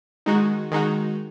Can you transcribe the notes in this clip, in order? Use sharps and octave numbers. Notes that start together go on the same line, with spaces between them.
D#3 G#3 D#4 F#4
D#3 G#3 D#4 F#4